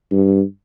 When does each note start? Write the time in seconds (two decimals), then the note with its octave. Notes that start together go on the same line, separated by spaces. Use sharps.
0.11 G2